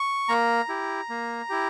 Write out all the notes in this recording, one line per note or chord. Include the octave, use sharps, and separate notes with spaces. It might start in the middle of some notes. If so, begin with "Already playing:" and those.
Already playing: C#6
A#3 A#5
E4 G4
A#3
E4 G4